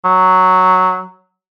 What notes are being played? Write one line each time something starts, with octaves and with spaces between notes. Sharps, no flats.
F#3